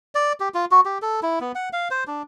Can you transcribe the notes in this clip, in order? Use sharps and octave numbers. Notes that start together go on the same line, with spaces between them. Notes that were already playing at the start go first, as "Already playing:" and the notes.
D5
G4
F4
F#4
G4
A4
E4
B3
F#5
F5
C5
D4